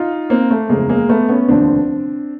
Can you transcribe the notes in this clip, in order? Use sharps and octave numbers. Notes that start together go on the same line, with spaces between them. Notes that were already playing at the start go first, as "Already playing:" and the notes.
Already playing: D#4 F4
A#3 C4
A3
F#1 E2 C#3 F3 G#3 A#3
G#3 A#3
A3 B3
B3 C#4
F1 D#2 D3 F3 C4 D4